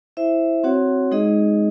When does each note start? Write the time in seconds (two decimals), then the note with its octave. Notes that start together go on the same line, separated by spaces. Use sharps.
0.17 E4 C5 E5
0.64 C4 F#4 C#5 F#5
1.11 G#3 D#4 G#4 D#5